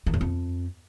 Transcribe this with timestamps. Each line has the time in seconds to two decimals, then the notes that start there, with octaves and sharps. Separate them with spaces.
0.06 D#3
0.14 F#2
0.21 F2